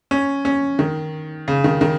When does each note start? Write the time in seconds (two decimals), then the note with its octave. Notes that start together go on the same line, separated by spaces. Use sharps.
0.11 C#4
0.45 C#4
0.79 D#3
1.48 C#3
1.64 D#3
1.81 D#3